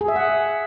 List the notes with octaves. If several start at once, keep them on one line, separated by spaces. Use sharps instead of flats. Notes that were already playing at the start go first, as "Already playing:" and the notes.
G#4
E5
F#5